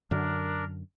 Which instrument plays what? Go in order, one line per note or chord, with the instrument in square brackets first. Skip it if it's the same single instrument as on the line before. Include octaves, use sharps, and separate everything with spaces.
[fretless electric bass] F#2 D3 [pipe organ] D4 A#4